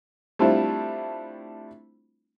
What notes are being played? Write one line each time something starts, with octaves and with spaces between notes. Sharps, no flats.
G3 A3 C4 D4 E4 F4